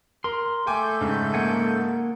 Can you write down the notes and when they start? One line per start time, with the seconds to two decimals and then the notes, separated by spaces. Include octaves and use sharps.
0.24 A#4 C6
0.67 A3 A4 G5 G#5 D6 G6
1.01 G#2 C#3
1.34 A#3 F#5 G#5